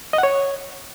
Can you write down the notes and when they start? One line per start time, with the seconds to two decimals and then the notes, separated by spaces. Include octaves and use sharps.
0.13 D#5
0.18 F#5
0.23 C#5